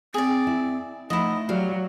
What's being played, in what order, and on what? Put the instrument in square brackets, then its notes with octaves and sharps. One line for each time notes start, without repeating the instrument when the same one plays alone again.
[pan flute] C4 [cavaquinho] G#4 D5
[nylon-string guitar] E4
[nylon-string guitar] F3 D#4 F#5 [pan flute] A3 [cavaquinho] E4 D#5
[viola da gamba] F#3 [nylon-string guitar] F#4 G4 D5 [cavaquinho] F5